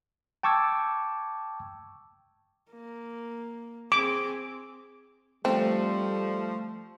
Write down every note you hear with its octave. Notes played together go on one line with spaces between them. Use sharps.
G5 A5 C#6 D6 E6 G#6
A#3
C4 G#4 D6
F3 G3 A3 C4